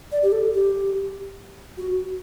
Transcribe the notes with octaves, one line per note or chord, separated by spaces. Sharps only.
D5
G4
A4
G4
F#4